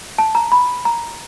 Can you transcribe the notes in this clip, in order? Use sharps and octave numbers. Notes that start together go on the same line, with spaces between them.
A5
A#5
B5
A#5